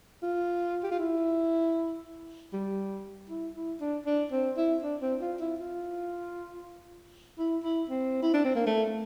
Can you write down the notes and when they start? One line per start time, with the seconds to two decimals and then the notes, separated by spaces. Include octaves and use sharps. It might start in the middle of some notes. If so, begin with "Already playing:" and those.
0.23 F4
0.84 G4
0.92 F4
0.99 E4
2.53 G3
3.30 E4
3.55 E4
3.81 D4
4.06 D4
4.32 C4
4.57 E4
4.83 D4
5.02 C4
5.21 F4
5.41 E4
5.60 F4
7.39 E4
7.64 E4
7.90 C4
8.23 E4
8.34 D4
8.45 C4
8.56 A#3
8.67 A3